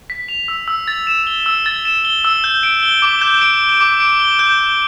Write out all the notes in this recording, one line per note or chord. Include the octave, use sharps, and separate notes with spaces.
B6
F7
E6
E6
A6
E7
G7
E6
A6
E7
G7
E6
G6
D7
G7
D6
G6
D7
G7
D6
D7
G7
G6
G6